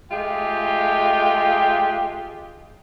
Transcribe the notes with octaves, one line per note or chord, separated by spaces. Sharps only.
G#3 A3 F4 G4 G5